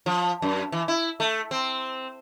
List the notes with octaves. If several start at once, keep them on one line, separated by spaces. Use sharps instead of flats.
F3
F#2
E3
E4
A3
C4